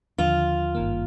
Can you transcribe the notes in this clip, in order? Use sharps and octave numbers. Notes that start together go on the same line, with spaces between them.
D#2 D3 F3 F4
G#1 G2 D#3 A#3